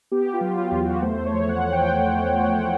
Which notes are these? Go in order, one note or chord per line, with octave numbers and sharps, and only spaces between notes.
B3 G4
F4
F#3
F4
E2
F#4
A3 C5
C#5
F3
F#5
G5